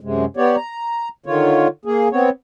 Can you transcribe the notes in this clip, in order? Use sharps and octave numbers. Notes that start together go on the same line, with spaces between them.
F#2 C3 G#3
B3 G4 C#5 D5
A#5
D3 D#3 F4 C#5
A#3 G#4
B3 C4 C#5